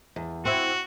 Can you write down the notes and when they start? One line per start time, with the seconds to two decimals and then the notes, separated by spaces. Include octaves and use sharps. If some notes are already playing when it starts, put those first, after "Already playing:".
0.16 E2
0.45 C4 E4 F#4